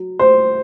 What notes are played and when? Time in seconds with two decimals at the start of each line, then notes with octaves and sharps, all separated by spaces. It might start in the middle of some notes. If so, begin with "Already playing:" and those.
Already playing: F#3
0.19 C5